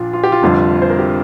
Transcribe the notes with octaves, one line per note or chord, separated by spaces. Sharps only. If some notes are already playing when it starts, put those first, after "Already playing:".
Already playing: A#1 A#2 F3 D4 F4
F4
G4
F4
F1 F2 D3 G3
C5
A#4
G4